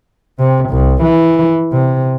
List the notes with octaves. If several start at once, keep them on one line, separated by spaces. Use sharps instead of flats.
C3
C2
E3
C3